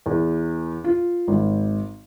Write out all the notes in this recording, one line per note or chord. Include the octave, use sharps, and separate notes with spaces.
E2
F4
G#1